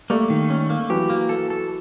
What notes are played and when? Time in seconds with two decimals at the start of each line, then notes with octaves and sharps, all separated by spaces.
0.10 G3 A3 A#3
0.30 D#3
0.50 C#4
0.70 A#3
0.90 E3 F#3 G4
1.10 A#3
1.29 A4
1.50 A4